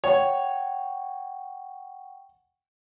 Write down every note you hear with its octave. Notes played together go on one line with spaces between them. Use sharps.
C#5 F#5 G5 C#6